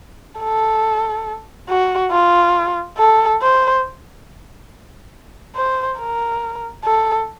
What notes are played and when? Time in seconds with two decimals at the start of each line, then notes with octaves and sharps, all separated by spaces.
0.39 A4
1.68 F#4
2.11 F4
2.98 A4
3.41 C5
5.55 C5
5.99 A#4
6.84 A4